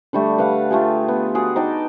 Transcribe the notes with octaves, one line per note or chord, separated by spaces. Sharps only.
D3 G3 A3
B4 F5 F#5
A3 F4 G4 G#4
B3
F#4 G#4 D5
D#4 D5 G5 A5